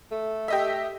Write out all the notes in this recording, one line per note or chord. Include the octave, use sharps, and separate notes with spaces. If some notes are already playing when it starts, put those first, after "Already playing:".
A3
G4 D#5 E5